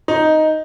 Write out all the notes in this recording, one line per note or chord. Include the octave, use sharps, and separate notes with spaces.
D#4